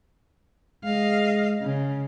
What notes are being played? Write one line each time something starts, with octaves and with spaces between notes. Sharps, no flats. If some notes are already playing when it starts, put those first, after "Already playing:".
G#3 D#5 F5
C#3